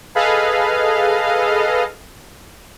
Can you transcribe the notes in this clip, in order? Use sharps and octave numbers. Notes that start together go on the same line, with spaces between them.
G#4 A4 B4 D#5 F5